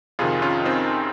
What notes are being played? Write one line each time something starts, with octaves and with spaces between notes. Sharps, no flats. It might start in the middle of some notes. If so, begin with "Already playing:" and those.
F2 C3 D#3 F4 G#4
C#4 F4
C4 D#4